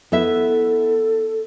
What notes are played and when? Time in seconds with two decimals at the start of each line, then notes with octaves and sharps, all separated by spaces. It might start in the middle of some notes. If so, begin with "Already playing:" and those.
0.12 B3 E4 A4 E5